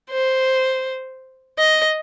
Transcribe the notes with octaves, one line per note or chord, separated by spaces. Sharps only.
C5
D#5